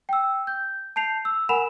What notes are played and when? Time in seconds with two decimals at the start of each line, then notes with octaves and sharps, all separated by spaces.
0.09 G5 E6
0.47 G6
0.96 A5 G6 C7 F7
1.25 E6
1.49 A#4 F#5 G#5 B5 E7 F7